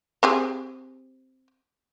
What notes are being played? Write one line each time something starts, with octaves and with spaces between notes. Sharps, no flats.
C4 G4 G#4